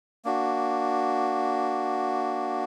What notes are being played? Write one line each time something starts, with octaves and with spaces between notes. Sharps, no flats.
A#3 D4 F#4